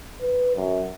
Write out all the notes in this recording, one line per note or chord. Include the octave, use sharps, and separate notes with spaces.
B4
F#2